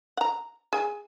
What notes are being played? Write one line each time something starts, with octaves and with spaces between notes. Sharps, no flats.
F#5 A#5
G#4 G#5